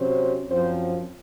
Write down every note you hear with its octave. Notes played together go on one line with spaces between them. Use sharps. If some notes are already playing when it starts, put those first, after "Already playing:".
Already playing: C3 F#3 C#4 C5
F#2 F3 C4 C5